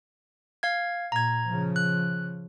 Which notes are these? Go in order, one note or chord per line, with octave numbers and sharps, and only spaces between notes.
F5 G#6
A#2 A#5 G#6
C#3 F3
F#6